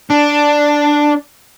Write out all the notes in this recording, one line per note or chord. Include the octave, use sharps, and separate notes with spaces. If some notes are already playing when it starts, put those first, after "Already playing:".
D4